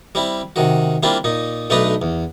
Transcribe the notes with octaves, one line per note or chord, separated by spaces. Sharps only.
G3 C4 E4
C3 D#3 F#4
G3 A#3 C4 D4 E4 F4
A#2 D#4
B1 A3 D4 D#4 B4 A#5
E2